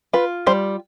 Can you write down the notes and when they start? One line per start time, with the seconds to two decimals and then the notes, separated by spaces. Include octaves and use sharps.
0.13 F4 B4
0.46 G3 C5